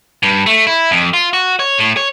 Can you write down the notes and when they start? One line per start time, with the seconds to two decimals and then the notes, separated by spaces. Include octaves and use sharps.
0.23 G2
0.46 A3
0.67 E4
0.91 F2
1.14 F4
1.33 F#4
1.59 C#5
1.78 A2
1.97 C#5